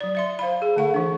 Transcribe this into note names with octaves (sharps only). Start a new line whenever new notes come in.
F#3 D5
D5 E5 C6
C5 F5 B5
G#4
D3 A3 F#5 C#6
E3 D4